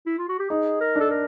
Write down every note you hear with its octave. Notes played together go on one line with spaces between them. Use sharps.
E4
F4
F#4
G4
D#4 G#4
A#4
D4 A4
A#4